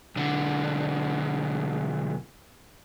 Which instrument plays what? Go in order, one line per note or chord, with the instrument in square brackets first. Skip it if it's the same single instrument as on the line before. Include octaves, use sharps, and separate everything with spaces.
[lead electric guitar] B1 D3